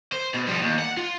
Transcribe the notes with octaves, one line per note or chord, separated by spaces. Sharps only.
C5
B2
F3 G3
D#2
F#5
F4